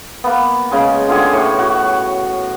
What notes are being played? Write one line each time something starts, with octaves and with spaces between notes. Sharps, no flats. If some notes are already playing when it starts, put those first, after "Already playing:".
A#3 B3
C#3 G#3
D3 F4 G4 G#4
A2 C#6
F#4